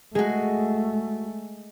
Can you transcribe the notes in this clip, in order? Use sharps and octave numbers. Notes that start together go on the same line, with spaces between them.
G#3 A3 F#4 G#4